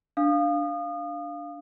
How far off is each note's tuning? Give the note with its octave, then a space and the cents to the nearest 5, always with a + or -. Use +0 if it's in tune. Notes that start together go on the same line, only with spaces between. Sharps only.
D4 +0 F5 +0 D#6 -30